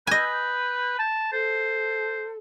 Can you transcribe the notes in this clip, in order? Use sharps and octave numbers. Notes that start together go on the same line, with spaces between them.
B4 D#5 G#5 E6 G6
G6
A5
A4 C5